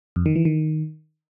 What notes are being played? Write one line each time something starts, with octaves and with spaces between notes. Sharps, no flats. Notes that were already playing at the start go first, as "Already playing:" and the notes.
F2
D#3
E3
D#3